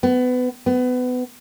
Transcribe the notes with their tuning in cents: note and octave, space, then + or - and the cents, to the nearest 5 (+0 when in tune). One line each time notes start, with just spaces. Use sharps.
B3 +25
B3 +25